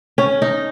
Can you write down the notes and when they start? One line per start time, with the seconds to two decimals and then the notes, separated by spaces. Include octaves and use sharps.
0.18 C#4
0.42 D#4